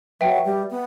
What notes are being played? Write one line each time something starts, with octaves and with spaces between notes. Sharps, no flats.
F#3 B4 E5 G5
G3
B3